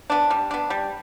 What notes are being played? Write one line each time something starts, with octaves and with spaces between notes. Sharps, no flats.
B3 D4
G3
B3 D4
G3